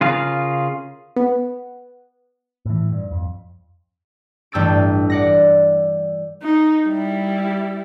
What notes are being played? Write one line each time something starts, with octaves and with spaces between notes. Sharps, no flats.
C#3 F4 G#4 A#4 F5
B3
A2 E3
G2
F2
A1 G2 G5 E6 A6 D7
D5 F#5 A#6
D#4
G3 E4